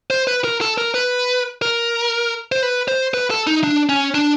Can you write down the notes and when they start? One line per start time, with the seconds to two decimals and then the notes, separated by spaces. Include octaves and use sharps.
0.10 C5
0.27 B4
0.44 A#4
0.61 A4
0.78 A#4
0.94 B4
1.62 A#4
2.52 C5
2.63 B4
2.88 C5
3.14 B4
3.30 A4
3.47 D#4
3.64 D4
3.89 C#4
4.14 D4